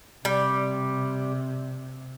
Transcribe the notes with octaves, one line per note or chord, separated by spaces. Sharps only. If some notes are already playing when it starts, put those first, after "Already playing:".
C3 G3